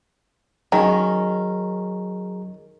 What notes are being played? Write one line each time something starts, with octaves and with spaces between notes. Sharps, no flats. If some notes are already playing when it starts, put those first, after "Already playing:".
D#3 F#3 C#4 G#4 A#5